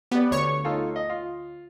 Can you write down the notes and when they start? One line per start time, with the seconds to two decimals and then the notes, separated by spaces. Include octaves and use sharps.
0.11 B3 G4 B4 D5
0.31 D2 C#5 C#6
0.64 D#4 F4 A4
0.96 D#5
1.10 F4